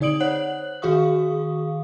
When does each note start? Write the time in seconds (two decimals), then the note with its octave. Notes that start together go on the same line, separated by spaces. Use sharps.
0.01 D3 D#4 D5 D#6 D7 F#7
0.20 C5 C#5 F#5 F#6 F#7
0.82 D#3 F#4 G#4 F5 C#6 D#6